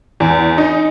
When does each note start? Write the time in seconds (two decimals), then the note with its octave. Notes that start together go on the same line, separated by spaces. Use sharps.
0.20 E2
0.58 D#4